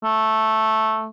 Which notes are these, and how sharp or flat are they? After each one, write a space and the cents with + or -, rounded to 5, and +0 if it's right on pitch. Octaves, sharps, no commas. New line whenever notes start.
A3 -5